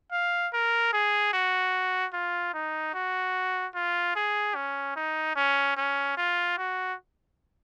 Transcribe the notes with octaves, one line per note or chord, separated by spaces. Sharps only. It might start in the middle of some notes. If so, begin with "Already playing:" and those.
F5
A#4
G#4
F#4
F4
D#4
F#4
F4
G#4
C#4
D#4
C#4
C#4
F4
F#4